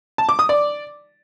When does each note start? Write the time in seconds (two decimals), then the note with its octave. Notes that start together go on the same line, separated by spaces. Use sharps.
0.18 A5
0.29 D6
0.39 D#6
0.49 D5